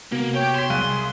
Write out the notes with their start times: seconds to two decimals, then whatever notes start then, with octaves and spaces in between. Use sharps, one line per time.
0.12 C3 A#3 B3 F#4
0.35 G4 C#5 G5 G6
0.56 C6 B6 E7
0.70 C2 G#4 F5 F#6 D#7